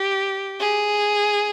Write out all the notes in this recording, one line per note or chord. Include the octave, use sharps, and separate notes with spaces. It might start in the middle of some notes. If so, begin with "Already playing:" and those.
Already playing: G4
G#4